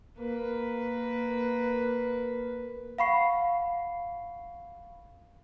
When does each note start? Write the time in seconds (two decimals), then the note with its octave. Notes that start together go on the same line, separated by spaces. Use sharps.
0.18 A#3 B4
2.98 F5 F#5 B5 C#6 C7